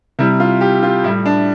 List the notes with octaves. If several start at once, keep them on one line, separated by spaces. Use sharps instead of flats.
C3 G3 E4
F4
G4
F4
A2 G3 E4
D4